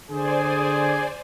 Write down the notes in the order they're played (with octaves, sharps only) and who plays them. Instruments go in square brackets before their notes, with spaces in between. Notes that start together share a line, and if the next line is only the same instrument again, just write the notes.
[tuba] D3 [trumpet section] G#4 [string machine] C5 D5 G#5